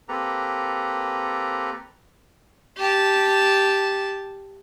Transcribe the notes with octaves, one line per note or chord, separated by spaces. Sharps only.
A#3 C4 G4 A4 B4 A#5
G4 A5